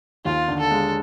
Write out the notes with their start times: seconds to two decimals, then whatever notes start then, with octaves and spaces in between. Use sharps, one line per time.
0.25 D#2 F4
0.48 D3
0.59 A4
0.71 G#3